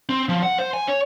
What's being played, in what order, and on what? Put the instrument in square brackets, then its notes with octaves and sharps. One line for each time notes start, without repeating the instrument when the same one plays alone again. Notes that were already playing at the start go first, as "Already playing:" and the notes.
[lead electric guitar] C4
F3
F#5
C5
G#5
C#5